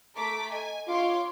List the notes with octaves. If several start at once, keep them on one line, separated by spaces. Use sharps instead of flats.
A3 A#5 D6 B6
D#5 G#5
F4 C#5 C6 D6